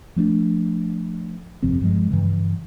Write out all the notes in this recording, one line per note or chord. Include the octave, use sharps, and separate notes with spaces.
F3 A3 A#3 D4
G1 F2 C3 C4
G2 F3 G#3
G2 C#3 E3